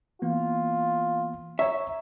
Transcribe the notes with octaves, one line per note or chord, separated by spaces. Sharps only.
E3 A#3 B3 F4
C#5 E5 A#5 C#6